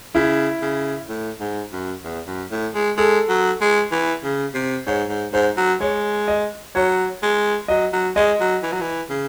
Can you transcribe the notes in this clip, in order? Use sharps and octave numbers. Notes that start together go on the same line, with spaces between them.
C#3 E4
C#3
A2
G#2
F#2
E2
F#2
A2
G#3
G#3 A4
F#3
G#3
E3
C#3
C3
G#2 C#5
G#2
G#2 C5
F#3
G#3 C#5
D#5
F#3 C#5
G#3
F#3 D#5
F#3
G#3 D#5
F#3
E3
F#3
E3
C#3